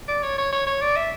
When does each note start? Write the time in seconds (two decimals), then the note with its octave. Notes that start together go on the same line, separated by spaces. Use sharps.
0.08 D5
0.23 C#5
0.38 C#5
0.52 C#5
0.67 C#5
0.82 D5
0.96 E5